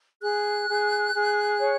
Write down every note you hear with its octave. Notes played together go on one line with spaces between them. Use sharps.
G#4 F#6
G#4
G#4
C#5